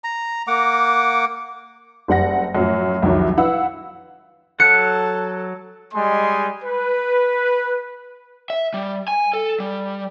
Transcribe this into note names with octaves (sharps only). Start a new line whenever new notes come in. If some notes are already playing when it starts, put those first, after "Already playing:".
A#5
A#3 F#5 D6
F#1 G3 F#5 A#6
F#2 A2 F3
C2 F2 D#3 F#3
E4 B4 F5 F#5 E6
F#3 A4 F#5 F#6 C#7
G3 G#3 D#5 G#5 C6
B4
E5
G3
G#5
A4
G3